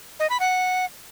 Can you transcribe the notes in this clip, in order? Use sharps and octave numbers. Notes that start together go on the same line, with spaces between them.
D#5
B5
F#5